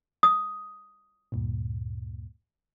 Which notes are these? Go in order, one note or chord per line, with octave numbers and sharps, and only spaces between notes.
D#6
D2 G2 A#2